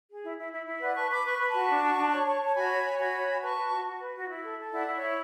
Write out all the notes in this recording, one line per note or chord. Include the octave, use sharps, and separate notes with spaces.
G#4
E4
E4
E4
E4
B4 D5 F#5
B4 A5 C#6
B4 B5 D6
B4 C#6
B4 B5
F#4 A5 C#6
D4
F#4
D4
C#5
C#5
C#5 A5
F#4 G#5 B5
C#5
C#5
F#4 G#5 B5
C#5
F#4
B4 A5 C#6
B4
F#4
F#4
B4
F#4
E4
A4
A4
E4 D5 F#5
E4
C#5 E5
E4